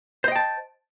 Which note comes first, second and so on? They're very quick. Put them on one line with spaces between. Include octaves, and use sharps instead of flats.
C5 D#5 G5 A5